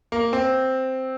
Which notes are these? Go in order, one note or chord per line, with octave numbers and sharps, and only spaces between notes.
A#3
C4